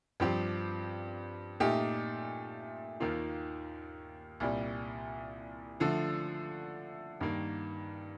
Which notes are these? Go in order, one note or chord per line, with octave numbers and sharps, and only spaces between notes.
G2 F3 C4 G4
A#2 A3 D#4 G4
D#2 D#3 A#3 F4
C2 A#2 G3
D3 F3 A3
G2 D#3 A#3